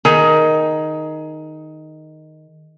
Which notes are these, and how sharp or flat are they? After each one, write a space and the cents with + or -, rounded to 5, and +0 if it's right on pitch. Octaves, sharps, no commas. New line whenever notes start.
D#3 +0 G#4 +20